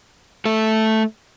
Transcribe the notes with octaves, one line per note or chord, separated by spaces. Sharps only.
A3 A4